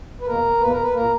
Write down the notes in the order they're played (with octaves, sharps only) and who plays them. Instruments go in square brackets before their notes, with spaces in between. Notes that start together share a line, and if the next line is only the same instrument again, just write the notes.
[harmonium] B4
E2 B2 A#3 A#4
E2 B2 A#3 B4
A#4
B4
A#2 A#3 A#4